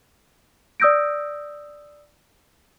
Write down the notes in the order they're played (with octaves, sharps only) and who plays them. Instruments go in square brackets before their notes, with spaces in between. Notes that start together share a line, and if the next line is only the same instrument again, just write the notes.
[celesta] D5 D#6 E6 G6 A#6 D7